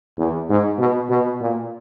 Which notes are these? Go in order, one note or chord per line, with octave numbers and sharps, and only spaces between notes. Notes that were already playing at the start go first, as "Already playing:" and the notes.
E2
G#2
B2
B2
A#2